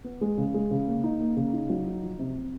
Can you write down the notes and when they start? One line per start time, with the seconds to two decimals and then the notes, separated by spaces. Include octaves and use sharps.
0.04 B3
0.21 G#3
0.38 C#3
0.54 G#3
0.71 C#3
0.87 A#3
1.04 D#4
1.21 A#3
1.37 C#3
1.53 D#4
1.70 F#3
1.86 D#4
2.02 F3
2.19 C3
2.35 C3